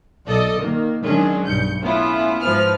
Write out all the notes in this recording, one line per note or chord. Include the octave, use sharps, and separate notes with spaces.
B1 A4 D5 D#5
D#3 A#3
D#3 F#3 G#3 C#4 D4 G#4
B1 G2 G6 C#7
A2 B3 C#4 E4 F4
G#2 F3 B4 F6